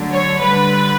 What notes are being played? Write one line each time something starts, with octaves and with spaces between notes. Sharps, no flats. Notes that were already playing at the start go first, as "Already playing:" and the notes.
Already playing: D3 F#3 A3
C#5
D3 G3 B4